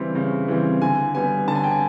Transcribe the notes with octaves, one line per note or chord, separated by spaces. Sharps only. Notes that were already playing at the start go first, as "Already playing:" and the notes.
Already playing: C#3 E3 G3 C4
C#3
E3 G3 C4
D3 G#5
G3 B3 G#5
D3 A5
G#5
G5
G#5